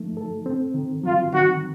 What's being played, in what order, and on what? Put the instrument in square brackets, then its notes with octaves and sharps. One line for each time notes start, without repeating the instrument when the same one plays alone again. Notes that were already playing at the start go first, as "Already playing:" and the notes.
Already playing: [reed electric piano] F3 A3 D#4
A4
C4
D#3
[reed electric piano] F#3 [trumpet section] F4
[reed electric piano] D#3 [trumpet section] F#4